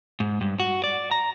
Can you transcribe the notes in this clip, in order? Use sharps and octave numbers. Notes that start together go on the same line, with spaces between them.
G#2
G2
F#4
D5
A#5